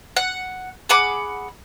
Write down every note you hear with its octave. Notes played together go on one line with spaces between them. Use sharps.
F#5
G#4 F#5 B5 D6